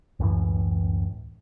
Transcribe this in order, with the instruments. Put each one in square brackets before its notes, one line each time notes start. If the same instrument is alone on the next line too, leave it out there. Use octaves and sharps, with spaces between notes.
[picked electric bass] C#2 F#2 A2 E3